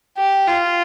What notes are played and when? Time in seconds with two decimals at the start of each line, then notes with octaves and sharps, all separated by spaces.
0.18 G4
0.47 F4